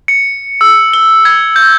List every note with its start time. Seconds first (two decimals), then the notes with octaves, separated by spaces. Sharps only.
0.08 C#7
0.61 E6
0.93 G7
1.25 G#6
1.56 G6